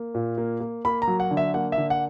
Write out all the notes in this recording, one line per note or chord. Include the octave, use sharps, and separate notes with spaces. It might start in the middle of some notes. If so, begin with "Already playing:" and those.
Already playing: A#3
A#2
A#3
A#3
A#3 B5
A#5
F#3
F#5
D3
E5
A#3 F#5
E5
D3
F#5